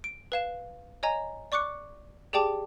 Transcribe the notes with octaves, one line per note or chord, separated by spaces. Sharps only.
D7
B4 F5 E7
C#5 D#5 G#5 A#5
D5 C#6 D6 F#6 C#7
G4 G#4 D5 G5 A5 D6